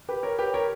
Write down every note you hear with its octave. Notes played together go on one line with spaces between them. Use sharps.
G4 B4
A#4 C#5
G4 B4
A#4 C#5